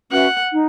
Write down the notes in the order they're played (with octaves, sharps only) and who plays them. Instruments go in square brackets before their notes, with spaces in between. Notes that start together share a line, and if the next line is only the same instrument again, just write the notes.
[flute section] C#4 F#4 B4 E5 [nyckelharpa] F#5
[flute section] D#4